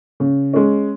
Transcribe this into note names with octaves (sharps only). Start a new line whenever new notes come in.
C#3
G#3 C#4